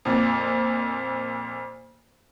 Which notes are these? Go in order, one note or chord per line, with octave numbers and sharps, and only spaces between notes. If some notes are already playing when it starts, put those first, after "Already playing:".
F2 A#2